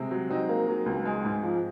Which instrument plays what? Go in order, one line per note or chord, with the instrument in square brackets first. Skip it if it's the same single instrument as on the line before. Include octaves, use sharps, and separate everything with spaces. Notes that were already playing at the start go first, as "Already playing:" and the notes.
Already playing: [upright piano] C3 [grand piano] G#3 C4
[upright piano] F#3
[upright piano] F#3 [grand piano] C4 D#4
[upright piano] A#3
F#3
C#2
G#3
G#2
F3